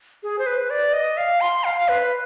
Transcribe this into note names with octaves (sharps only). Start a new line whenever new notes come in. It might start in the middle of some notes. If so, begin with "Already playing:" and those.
G#4
C5
B4
D5
D#5
F5
C6
F5
B4